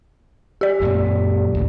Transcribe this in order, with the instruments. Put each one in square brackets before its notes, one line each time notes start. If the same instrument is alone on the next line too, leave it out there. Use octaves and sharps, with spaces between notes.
[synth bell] G4 D5
[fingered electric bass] F#2 A#2
G#1 D2